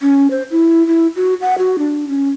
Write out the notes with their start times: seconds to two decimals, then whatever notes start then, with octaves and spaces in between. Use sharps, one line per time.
0.02 C#4
0.31 C5
0.51 E4
0.87 E4
1.16 F#4
1.41 F#5
1.58 F#4
1.79 D4
2.08 C#4